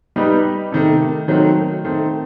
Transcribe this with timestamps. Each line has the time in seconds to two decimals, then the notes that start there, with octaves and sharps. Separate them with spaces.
0.16 G3 D#4 G4 B4
0.72 C3 D#3 A3
1.28 D#3 F#3 A3 C4
1.85 D#3 A3 C4